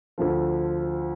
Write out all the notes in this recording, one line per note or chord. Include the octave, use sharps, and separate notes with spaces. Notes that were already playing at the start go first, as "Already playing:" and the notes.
D2 D3 F3